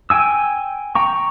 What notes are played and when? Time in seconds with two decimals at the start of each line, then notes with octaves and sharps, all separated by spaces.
0.10 G5 G#5 E6
0.95 G5 A#5 C#6